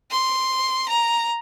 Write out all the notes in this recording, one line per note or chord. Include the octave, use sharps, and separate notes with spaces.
C6
A#5